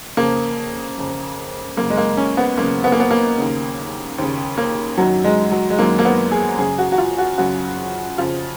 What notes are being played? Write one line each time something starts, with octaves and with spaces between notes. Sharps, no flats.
F2 C#3 A#3
F2 C#3
F#2 C#3 A#3
G#3
A#3
C#4
B3
F#2 C#3 A#3
B3
A#3
B3
A#3
D#2 C#3
D#2 C#3
A#3
F#2 D#3 F#3
G#3
F#3
G#3
F#2 D#3 A#3
A#3
B3
G#4
F#2 C#3 G#4
F#4
F#4
F4
F#4
F#2 C#3 F#4
F2 C#3 F4